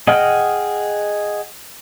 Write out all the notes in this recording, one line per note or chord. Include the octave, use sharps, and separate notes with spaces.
G#4 D#5 F#5 G5 F6